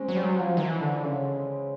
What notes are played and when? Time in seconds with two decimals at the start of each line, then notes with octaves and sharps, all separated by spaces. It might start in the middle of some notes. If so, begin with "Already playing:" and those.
Already playing: G#3 C4 C#4
0.08 F#3
0.16 G3
0.24 F#3
0.40 F3
0.57 D#3
0.61 E3
0.81 D3
1.03 C#3